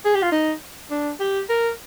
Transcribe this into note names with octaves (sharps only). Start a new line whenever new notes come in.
G#4
G4
F4
D#4
D4
G4
A#4